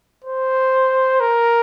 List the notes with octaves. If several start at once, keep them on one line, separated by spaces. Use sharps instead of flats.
C5
A#4